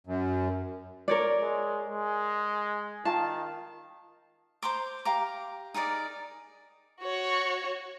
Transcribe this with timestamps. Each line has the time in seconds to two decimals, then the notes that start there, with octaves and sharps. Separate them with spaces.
0.07 F#2
1.08 A#4 C#5 D5
1.41 G#3
1.89 G#3
3.05 D#3 F4 A5
4.62 C5 A#5 C6 D6
5.05 G4 F5 A#5 D6
5.74 D#4 G#4 A#4 D5
7.01 F#4 C#5